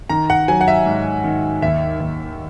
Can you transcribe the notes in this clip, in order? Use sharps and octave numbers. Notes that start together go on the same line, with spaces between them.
D#3 A#5
F#5
F#3 G#5
F#5
E5
G#2
D#3
D#2 E5
D#2